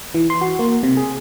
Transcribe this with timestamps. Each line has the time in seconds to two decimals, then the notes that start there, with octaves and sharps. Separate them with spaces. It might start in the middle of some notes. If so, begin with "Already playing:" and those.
0.14 E3
0.30 C6
0.41 F#4
0.59 A#3
0.83 C3
0.97 G#4